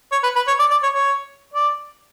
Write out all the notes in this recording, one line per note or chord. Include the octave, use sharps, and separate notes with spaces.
C#5
B4
B4
C#5
D5
D5
C#5
C#5
D5